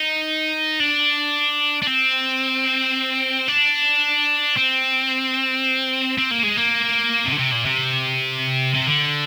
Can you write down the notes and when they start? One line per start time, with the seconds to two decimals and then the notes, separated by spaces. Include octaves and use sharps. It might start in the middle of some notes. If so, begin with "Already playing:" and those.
Already playing: D#4
0.80 D4
1.83 D4
1.87 C4
3.48 D4
4.56 C4
6.18 C4
6.31 A#3
6.43 G#3
6.57 A#3
7.26 C3
7.32 D3
7.38 C3
7.52 A#2
7.65 C3
8.75 C3
8.86 D3